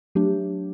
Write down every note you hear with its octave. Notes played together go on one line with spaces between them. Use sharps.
F#3 A3 D4 G4